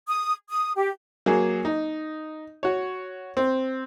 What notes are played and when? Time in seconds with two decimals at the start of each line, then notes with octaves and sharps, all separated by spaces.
0.08 D#6
0.49 D#6
0.76 G4
1.26 F#3 A#3 G#4
1.65 D#4
2.63 F#4 C#5
3.37 C4